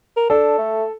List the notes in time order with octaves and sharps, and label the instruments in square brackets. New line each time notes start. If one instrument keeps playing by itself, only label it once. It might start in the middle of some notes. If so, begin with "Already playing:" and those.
[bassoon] A#4
[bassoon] D4 [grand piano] A4
[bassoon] A3